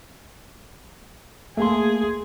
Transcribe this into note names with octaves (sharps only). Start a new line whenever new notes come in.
A3 A#3 G#4 C6